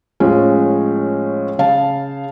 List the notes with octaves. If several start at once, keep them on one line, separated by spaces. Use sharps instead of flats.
A2 F3 G#3 C#4
C#3 F5 A5